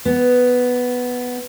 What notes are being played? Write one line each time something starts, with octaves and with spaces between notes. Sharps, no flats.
B3